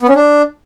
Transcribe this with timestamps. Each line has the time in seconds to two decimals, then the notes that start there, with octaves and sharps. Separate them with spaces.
0.02 B3
0.09 C#4
0.16 D4